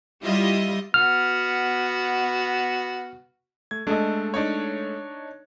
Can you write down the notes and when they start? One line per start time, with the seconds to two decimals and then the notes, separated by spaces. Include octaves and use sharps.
0.23 G3 E4 F4 G4 D#5 E5
0.94 B3 F#4 F6
3.71 A3 G#6
3.87 G#3 A3 D4 A4 D#5
4.34 D4 D#4 C#5